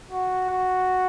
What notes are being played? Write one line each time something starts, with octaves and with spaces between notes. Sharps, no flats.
F#4
F#4